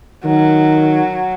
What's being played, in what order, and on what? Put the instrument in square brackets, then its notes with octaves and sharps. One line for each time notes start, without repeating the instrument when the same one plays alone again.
[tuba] D#3 [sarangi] F#3